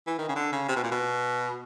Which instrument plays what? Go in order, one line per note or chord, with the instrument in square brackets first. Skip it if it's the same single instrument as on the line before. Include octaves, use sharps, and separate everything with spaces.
[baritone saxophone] E3
D#3
C#3
D3
C#3
C3
B2
A#2
B2